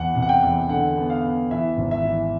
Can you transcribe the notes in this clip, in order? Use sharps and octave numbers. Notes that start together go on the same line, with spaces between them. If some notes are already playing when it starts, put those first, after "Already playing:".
Already playing: E2 F#5
C3
F#5
G5
E2
D3 F#5
B3
F5
B3
E3 E5
G#1
E5
E3